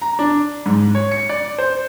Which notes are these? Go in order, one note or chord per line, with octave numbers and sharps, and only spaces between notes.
A#5
D4
G#2
C#5
C#7
D5
C5